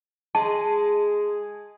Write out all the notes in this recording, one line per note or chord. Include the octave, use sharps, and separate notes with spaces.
G#3 A5